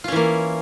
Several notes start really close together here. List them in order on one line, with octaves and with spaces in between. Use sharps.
F4 C#4 E3 A#3